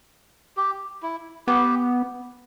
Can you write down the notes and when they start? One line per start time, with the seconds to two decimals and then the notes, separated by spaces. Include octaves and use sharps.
0.57 G4
1.03 E4
1.47 B3 G4